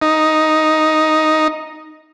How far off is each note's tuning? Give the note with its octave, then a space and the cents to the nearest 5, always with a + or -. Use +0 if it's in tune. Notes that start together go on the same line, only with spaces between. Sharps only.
D#4 +5